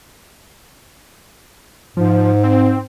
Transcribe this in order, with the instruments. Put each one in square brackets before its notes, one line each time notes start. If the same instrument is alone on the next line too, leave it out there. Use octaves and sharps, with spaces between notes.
[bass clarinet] G#2 [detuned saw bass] F3
[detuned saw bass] C4